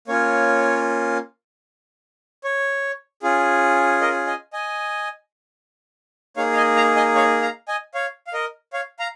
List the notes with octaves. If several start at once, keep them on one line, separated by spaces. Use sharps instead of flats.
A#3 C#4 F4 C#5
C#5
C#4 F4 G#4
A#4 D#5
D#5 G#5
D#5 G#5
A#3 D#4 G#4 C#5 F5
F5
D#5 G#5
F5 A#5
D#5 G#5
C#5 F5
F5 A#5
D#5 G#5
C#5 F5
F5
A#4 D#5
C#5 F5
F5 A#5